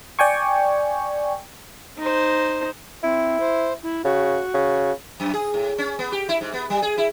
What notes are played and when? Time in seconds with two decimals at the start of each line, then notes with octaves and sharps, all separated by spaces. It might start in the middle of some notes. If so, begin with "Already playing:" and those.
0.19 D5 G5 G#5 C#6
1.98 D#4 C5
3.03 C4 E4
3.40 C5
3.83 E4
4.05 C#3 F#4
4.54 C#3
5.20 F#2
5.34 G#4
5.54 A2
5.78 C#4
5.99 B3
6.12 G4
6.29 E4
6.41 G#2
6.53 B3
6.70 G3
6.82 G#4
6.98 E4